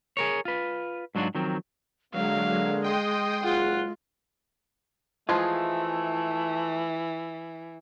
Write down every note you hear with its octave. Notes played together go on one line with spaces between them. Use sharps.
G#4 A#4 C#5
F4 B4
G#2 F#3 D4 F4 F#4
D#3 F3 F#3 C4
D3 F#3 G#3 A#3 F5
D#5 G5 C6 D#6
F#1 F4 G#4 F#5
E3 F3 G#3 A3 F4 G#4